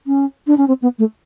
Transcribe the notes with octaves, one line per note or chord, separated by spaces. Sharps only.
C#4
D4
C#4
C4
B3
A3